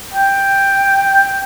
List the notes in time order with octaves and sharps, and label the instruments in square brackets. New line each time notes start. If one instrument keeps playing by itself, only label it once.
[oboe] G5